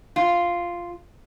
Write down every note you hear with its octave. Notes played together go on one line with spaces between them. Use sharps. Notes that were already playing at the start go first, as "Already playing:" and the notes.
F4